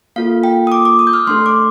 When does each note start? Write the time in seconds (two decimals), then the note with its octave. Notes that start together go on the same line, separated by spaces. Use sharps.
0.16 A#3 F4 A4 F5
0.44 G5
0.67 D#6
0.72 D6
0.85 D6
0.99 D#6
1.07 G6
1.13 F6
1.27 A3 D4 A4 C6
1.46 D6